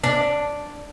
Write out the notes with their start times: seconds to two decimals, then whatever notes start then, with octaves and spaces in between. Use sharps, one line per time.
0.04 D4